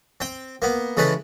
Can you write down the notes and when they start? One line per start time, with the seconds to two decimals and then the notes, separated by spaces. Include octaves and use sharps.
0.20 C4 G5
0.62 A#3 B3
0.97 C#3 E3 G#3 A4 B4